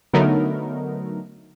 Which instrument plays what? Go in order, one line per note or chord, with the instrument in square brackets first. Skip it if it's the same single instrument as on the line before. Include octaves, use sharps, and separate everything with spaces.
[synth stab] D3 F#3 A3 B3 D#4 A#4